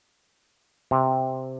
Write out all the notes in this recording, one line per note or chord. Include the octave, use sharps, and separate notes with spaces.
C3